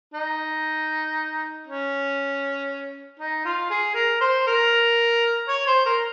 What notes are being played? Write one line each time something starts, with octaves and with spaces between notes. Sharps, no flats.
D#4
C#4
D#4
F4
G#4
A#4
C5
A#4
C#5
C5
A#4